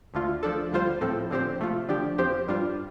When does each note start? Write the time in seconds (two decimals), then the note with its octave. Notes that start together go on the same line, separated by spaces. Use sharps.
0.14 D2 D3 A3 F4
0.43 F3 D4 A4
0.72 D2 D3 G3 F4 C5
1.01 A2 F3 C4 A4
1.30 D3 F3 C4 G4 C5
1.59 C3 A3 F4
1.89 D3 F3 D4 G4
2.18 F2 F3 C4 G4 C5
2.47 G2 G3 D4 F4